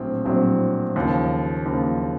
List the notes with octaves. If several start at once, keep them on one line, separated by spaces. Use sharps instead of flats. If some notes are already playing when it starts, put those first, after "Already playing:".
Already playing: A#1 A2 F#3 C4
A#1 A2 F#3 C4
D#2 C#3 F3
D#2 C#3 F3